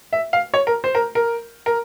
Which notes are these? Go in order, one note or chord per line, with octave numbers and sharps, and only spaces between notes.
E5
F5
C#5
A#4
C5
A#4
A#4
A#4